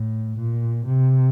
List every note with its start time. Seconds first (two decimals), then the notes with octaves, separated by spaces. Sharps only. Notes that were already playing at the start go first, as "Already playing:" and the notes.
Already playing: A2
0.37 A#2
0.86 C3